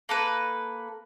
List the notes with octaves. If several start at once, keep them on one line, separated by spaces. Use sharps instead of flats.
A#3 A4 B4